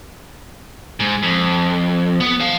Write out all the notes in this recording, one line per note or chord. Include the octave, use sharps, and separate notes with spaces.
G#2
F2
B3
F3 F5